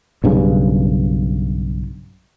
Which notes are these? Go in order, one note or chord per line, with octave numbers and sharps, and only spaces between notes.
B1 G2 C#3